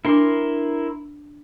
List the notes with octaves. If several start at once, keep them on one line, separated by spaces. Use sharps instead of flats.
D4 E4 A#4 C6 D6